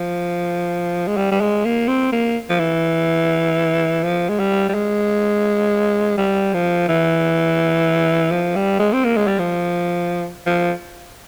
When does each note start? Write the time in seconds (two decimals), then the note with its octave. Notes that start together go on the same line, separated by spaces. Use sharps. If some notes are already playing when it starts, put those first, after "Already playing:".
Already playing: F3
1.07 G#3
1.17 G3
1.32 G3
1.41 G#3
1.65 A#3
1.88 C4
2.12 A#3
2.49 F3
2.59 E3
4.03 F3
4.29 G#3
4.39 G3
4.69 G3
4.74 G#3
6.17 G3
6.54 F3
6.88 E3
8.31 F3
8.55 G3
8.79 G#3
8.93 C4
9.05 A#3
9.16 G#3
9.27 G3
9.39 F3
10.46 F3